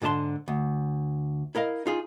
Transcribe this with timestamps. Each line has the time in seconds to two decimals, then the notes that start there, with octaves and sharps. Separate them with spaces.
0.02 G#2 D3 G#4 D5 A5 C6
0.48 D2
1.55 E4 A#4 D#5 F5
1.86 D#4 F4 G#4